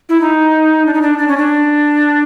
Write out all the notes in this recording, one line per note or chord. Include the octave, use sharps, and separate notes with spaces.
E4
D#4
D4
D#4
D4
D4
C#4
D4